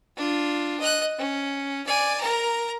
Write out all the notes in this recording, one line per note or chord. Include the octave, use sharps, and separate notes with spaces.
D4 F4
D#5 F#6
C#4
D5 G#5
A#4 A#5